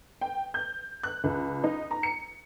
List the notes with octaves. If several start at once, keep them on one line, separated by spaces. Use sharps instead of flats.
G5
G6
F#6
C#2
D#4
A#5
C#7